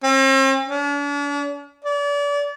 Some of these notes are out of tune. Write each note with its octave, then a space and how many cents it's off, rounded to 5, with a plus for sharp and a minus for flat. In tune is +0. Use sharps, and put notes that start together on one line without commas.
C4 +45
D4 -45
D5 -35